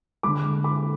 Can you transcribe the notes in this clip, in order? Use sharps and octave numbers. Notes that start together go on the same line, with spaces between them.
D3 G#3 B5 D6
B5 D6